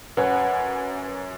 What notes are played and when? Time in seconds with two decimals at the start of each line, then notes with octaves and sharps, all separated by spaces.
0.17 F#2 B4 C#5 F#5 G#5